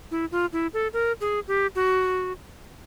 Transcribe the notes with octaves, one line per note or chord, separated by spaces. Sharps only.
E4
F4
E4
A4
A#4
G#4
G4
F#4